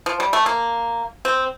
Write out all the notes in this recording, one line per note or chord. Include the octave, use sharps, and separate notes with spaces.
F3
G3
A3
A#3
C4